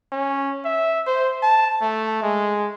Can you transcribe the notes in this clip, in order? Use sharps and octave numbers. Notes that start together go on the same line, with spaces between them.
C#4
E5
C5
A5
A3
G#3